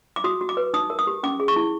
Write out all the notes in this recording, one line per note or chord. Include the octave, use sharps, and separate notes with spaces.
D6
F#4 D#6
F#4
D6
B4
D#4 D#6
A#4
D#6
G4
C#4 D6
G#4
C#6
E4